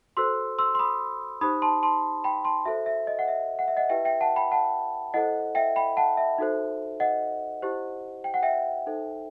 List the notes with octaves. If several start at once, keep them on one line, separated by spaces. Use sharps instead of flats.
F#4 A4 C5 C6 E6
C6 E6
C6
B5 D#6
D#4 G4 C5 B5 D#6
A5 C6
A5 C6
G5 B5
A5 C6
F#4 A4 C5 E5
E5
D#5
F#5
E5
F#5
E5
D#5 F#5
E4 G4 B4 E5 G5
E5 G5
F#5 A5
G5 B5
F#5 A5
E4 A4 C5 D#5 F#5
E5 G5
G5 B5
F#5 A5
E5
D#4 F#4 A4 C5
D#5 F#5
E4 G4 C5
G5
F#5
E5 G5
D#4 A4 C5